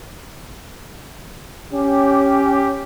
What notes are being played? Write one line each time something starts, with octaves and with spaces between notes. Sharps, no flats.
C#4 G4